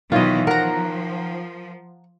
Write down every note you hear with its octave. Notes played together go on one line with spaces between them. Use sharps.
B2 D#3 E3 F#3 F4 C#5 D#5
F3 A#4 F#5 A#5